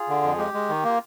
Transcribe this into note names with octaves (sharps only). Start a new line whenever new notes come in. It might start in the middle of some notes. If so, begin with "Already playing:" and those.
Already playing: F4 G#4
D3
F2
G#3 G4
G#3
D#3
A#3
F4